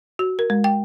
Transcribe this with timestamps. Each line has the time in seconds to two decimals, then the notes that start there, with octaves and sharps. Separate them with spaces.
0.19 F#4
0.39 A#4
0.50 G#3
0.64 G5